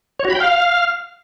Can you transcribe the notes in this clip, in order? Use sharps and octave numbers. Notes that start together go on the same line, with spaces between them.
C#5
F#4
B5
G5
F5